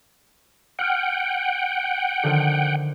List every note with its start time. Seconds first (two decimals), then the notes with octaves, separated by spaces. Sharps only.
0.79 F#5 G5 F6 F#6
2.23 D3 D#3 F3